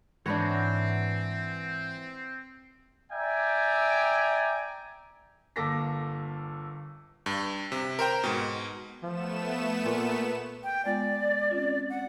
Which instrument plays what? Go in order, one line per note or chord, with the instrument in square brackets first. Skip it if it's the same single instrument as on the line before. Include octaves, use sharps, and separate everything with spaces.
[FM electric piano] G#2 F#5 A#6 [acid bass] E3 [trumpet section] C4 [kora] D4 B4 C#5
[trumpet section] D5 E5 G5 G#5 A#5
[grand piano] G1 A#3 A4 D6 A#6 B6
[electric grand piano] G2
C3
A#4 C5 G5 A#5
G#2 B2
[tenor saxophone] F3 [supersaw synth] A3 B3 E7
[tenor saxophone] A#2
[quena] G5
[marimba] G#3 B3 F4 [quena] D5
[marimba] C4 C#4 F4
[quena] F#5